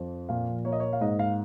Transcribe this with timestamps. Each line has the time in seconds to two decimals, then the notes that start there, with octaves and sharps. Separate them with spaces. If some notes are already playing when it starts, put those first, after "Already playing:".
Already playing: F2 F3
0.29 A#2 F5
0.65 A#3 C#5
0.73 D#5
0.80 C#5
0.93 F5
1.01 G#2 D#5
1.19 F5